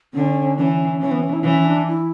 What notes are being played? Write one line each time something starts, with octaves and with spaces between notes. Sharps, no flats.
D3 C#4
E3 C#4 D4
E3 C#4
B3
C#4
E4
E3 C#4
D4
E4